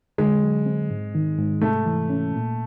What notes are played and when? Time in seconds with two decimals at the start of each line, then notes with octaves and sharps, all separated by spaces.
0.18 D3 G#3
0.43 F#3
0.66 C4
0.90 G#2
1.15 D#3
1.38 G#2
1.61 C3 A3
1.86 E3
2.10 C#4
2.34 A#2